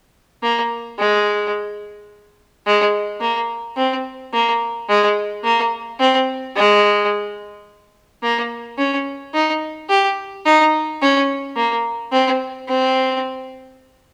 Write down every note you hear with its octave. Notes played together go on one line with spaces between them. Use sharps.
A#3
G#3
G#3
A#3
C4
A#3
G#3
A#3
C4
G#3
A#3
C#4
D#4
G4
D#4
C#4
A#3
C4
C4